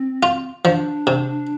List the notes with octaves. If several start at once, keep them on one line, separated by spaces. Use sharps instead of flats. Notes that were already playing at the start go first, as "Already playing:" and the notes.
Already playing: C4
F4
F3 D4
C3